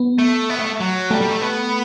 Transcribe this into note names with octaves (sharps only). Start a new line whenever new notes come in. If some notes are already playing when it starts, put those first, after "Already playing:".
Already playing: B3
A3
B3
A3
F#3
G3 A3
G3
A3
B3